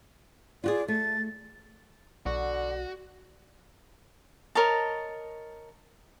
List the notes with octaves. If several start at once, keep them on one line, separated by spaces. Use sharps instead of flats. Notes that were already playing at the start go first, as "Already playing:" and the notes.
F4 F#4 G#4 D5
A3 A6
B1 D3 F#4
A#4 C#5 D#5 A5